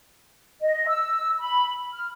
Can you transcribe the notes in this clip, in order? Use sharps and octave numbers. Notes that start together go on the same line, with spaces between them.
D#5
E6
B5
F6